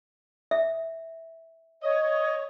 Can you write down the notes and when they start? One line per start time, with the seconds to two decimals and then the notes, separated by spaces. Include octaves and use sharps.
0.51 E5
1.83 C#5 D#5